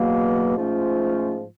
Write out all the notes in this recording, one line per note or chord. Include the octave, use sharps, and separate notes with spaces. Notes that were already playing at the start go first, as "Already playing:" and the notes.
Already playing: E2 B2 F#3 A#3
G#2 F3 A3 C#4 F4